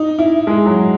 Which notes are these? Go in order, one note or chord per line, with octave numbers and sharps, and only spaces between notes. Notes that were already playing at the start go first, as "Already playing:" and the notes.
Already playing: D#4
E4
G#3
F#3